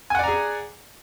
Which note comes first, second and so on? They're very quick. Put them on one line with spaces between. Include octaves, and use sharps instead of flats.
G#5 F#5 D5 A#5 G#4